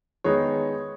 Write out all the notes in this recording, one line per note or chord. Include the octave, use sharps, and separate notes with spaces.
D#3 G#3 B3 D#4 C#5